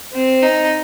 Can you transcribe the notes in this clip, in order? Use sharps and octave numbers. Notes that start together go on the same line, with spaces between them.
C4
D#4